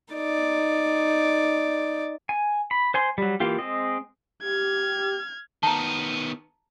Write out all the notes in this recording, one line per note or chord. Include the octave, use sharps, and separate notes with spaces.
D#4 D5
G#5
B5
C5 G#5 C6
F#3 G3
E3 A#3 F4 G4
G#3 C4 D#5
G4 F6 G#6
D#3 B3 A5 A#5